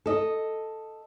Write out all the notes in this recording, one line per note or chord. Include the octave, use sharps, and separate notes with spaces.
A4 D#5